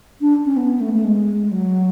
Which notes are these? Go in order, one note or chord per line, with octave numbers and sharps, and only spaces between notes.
D4
C#4
B3
A3
A3
G#3
F#3